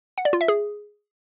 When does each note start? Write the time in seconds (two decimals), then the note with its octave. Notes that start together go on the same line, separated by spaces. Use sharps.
0.18 F#5
0.25 D5
0.33 F4
0.41 E5
0.48 G#4